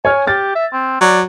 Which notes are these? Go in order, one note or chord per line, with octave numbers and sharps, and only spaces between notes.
C#5 G#5 F6
G4 F6 A6
E5
C4
F#3 D5